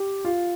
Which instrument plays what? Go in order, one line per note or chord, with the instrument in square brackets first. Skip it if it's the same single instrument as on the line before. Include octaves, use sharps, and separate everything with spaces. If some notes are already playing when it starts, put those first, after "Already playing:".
Already playing: [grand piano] G4
F4